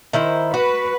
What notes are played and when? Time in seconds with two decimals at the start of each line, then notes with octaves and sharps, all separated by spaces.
0.13 D#3 E4 C5
0.54 F#4 B4